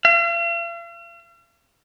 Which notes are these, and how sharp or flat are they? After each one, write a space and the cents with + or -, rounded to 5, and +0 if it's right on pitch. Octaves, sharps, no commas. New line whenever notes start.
F5 -45